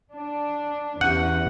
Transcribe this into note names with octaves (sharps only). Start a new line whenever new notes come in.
D4
E2 E3 C#4 G4 F#5